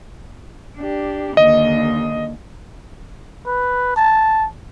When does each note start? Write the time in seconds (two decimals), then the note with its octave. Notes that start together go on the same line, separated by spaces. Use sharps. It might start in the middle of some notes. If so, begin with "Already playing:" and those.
0.77 D4 G4
1.37 D#2 D3 D#5
3.46 B4
3.96 A5